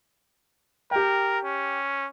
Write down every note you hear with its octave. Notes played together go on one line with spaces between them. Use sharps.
G4 A#4 G5
C#4